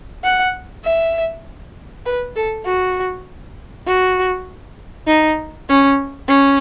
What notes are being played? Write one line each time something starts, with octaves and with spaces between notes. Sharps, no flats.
F#5
E5
B4
A4
F#4
F#4
D#4
C#4
C#4